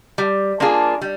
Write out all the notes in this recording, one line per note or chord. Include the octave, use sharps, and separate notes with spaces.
G3
A#3 D4 F4 G#4
G3